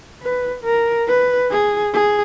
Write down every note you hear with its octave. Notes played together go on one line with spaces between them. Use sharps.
B4
A#4
B4
G#4
G#4